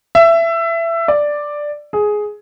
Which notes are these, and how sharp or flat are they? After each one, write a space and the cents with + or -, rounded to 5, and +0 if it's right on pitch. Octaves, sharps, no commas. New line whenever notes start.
E5 +20
D5 +5
G#4 +10